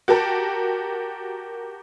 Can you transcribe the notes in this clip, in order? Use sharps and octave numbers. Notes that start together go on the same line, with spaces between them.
F#4 G4 A#4 A5